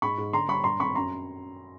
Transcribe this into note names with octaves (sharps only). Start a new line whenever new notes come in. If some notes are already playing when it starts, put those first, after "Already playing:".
G#2 B5 C#6
G#2
D3 A#5 C6
G3 B5 C#6
G2 A#5 C6
G#1 B5 C#6
F#2 A#5 C6